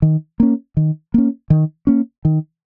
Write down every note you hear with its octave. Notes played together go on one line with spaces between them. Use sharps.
D#3
A#3 C#4
D#3
A#3 C#4
D#3
A#3 C#4
D#3